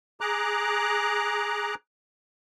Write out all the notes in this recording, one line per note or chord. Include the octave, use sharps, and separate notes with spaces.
G#4 A#5 D6 F#6